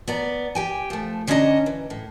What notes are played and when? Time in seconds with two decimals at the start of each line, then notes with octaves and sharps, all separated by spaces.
0.08 B3 D5 A#5
0.55 G4 G5 G#5
0.90 F3 A3
1.27 D3 C#4 D4 G4 D#5 A#5
1.66 E3
1.90 A2